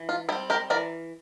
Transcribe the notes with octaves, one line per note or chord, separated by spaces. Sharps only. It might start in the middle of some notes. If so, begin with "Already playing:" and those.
Already playing: E3
F4
G3 C4 E4
G4 A#4
E3 A#4 D5